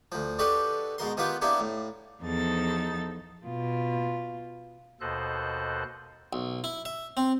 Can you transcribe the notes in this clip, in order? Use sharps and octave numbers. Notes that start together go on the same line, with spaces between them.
D2 F3
D4 F#4 G4 A4 B4 D#5
G#2 B2 A#4 C6
D#3 B3 F4 G4 B4
A#3 B3 D4 E4 G4
A2
E2 F3 D#4 A4 A6
B2 F4
D#2 B2 A4 C5 D#5 F#6
B1
E4
E5
C4